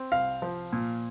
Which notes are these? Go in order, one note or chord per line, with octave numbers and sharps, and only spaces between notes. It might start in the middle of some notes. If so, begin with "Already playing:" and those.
Already playing: C4
C2 F5
F3
A#2